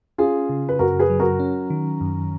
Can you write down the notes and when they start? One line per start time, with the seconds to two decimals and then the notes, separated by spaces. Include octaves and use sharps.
0.18 C#4 F4 G#4
0.49 C#3
0.69 B4
0.79 F#2 F#4 A#4
0.99 G#4 B4
1.10 F#3
1.20 F#4 A#4
1.40 C#4
1.70 D#3
2.01 F#2